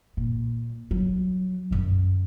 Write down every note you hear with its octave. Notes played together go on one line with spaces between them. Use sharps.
A#2
F#3
F#2 D3